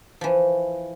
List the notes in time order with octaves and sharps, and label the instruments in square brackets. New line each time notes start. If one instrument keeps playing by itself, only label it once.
[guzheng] E3 F3